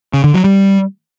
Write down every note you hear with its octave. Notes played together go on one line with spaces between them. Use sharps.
C#3
D3
F#3
G3